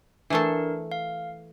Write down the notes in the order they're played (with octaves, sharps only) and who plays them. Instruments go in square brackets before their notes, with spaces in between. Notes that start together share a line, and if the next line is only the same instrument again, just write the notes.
[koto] E3 A3 A4 [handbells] D4 A#4
[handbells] F5